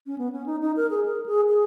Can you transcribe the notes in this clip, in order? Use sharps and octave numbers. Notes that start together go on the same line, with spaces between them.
C#4
B3
C#4
D#4
D#4
A#4
G#4
A#4
G#4
G#4